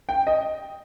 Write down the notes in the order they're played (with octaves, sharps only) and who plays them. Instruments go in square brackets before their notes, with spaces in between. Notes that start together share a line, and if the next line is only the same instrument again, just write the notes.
[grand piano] G5
D#5